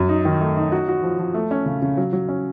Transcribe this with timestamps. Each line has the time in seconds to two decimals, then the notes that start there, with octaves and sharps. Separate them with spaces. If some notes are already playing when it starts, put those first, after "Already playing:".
Already playing: F#2
0.09 D#4
0.25 D#3
0.41 A3
0.57 D#4
0.72 F#4
0.88 F#4
1.03 F3
1.19 F3
1.34 A3
1.51 C#4
1.66 C#3
1.82 C#3
1.97 F#3
2.13 F#3
2.29 C#4